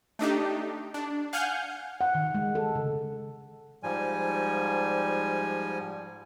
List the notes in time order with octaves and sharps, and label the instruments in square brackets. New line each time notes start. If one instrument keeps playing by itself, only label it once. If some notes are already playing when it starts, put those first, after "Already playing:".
[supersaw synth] A3 D4 D#4 G4
D4
F5 F#5 G#5 F6 G6
[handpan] F#5
D#3
G#3
A4
C#3
[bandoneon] G#2 F3 G3 G#5